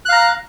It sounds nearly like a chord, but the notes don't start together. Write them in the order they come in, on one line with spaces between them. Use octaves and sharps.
F#6 F5 A#5